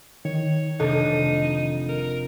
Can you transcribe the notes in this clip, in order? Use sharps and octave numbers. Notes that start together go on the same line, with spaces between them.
D#3 C#5
F1 D4 D#4 A4 C5
A#4